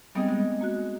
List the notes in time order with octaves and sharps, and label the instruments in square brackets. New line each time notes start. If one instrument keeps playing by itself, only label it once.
[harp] G3 D#4 G#4 [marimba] B3 C4
[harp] G#3
[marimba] A#3 F#4 F#6